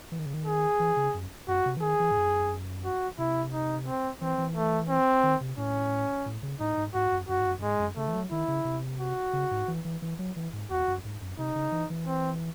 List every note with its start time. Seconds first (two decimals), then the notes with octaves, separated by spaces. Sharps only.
0.12 E3
0.19 D#3
0.26 C#3
0.34 D#3
0.46 G#4
0.80 E3
0.97 C#3
1.14 F#2
1.48 F#2 F#4
1.66 C3
1.77 E3
1.82 D#3 G#4
2.00 E3
2.11 G#2
2.17 F#2
2.84 F#4
3.18 C3 E4
3.53 D#4
3.87 C4
4.21 E3 C4
4.38 E3
4.56 A3
4.89 C4
5.23 D#3
5.41 C3
5.58 A2 C#4
6.26 A2
6.43 C#3
6.60 A2 D#4
6.77 G#2
6.94 G#2 F#4
7.12 F#2
7.29 F#2 F#4
7.39 G#2
7.46 F#2
7.59 F#2
7.63 G#2 G#3
7.79 F#2
7.97 C#3 A3
8.08 E3
8.14 F#3
8.31 D#3 E4
8.48 C#3
8.65 C3
9.00 F#4
9.33 C#3
9.51 G#2
9.68 E3
9.85 E3
10.02 E3
10.19 F#3
10.36 E3
10.53 G#2
10.70 E2 F#4
10.88 F#2
11.05 G#2
11.22 F#2
11.39 C3 D#4
11.56 C#3
11.72 E3
11.90 E3
12.07 C4